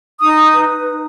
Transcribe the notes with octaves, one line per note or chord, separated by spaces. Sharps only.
D#4 D#6
B4
D#4